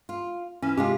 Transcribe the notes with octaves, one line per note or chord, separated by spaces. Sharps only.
F4
E3 C#4
C3 G#3 F4 G4